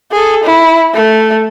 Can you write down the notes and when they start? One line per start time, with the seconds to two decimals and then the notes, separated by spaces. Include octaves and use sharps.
0.12 G#4 A4
0.44 E4
0.94 A3